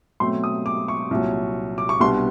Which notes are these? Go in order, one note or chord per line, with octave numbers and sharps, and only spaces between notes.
B2 F#3 A3 C4 C6
D#6
D6
C#6
C2 A#2 F#3
D6
C#6
C2 B2 G3 B3 D4 C6